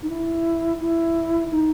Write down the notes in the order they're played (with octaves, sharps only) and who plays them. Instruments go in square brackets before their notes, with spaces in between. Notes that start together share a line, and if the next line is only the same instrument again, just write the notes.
[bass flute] D#4
E4
E4
D#4